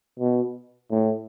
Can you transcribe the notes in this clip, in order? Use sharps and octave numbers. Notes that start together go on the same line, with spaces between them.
B2
A2